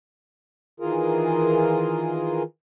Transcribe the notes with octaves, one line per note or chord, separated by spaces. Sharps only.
D#3 E3 F4 G#4 A#4